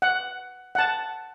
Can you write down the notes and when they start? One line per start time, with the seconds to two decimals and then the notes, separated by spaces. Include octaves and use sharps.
0.02 F#5
0.75 F#5 A5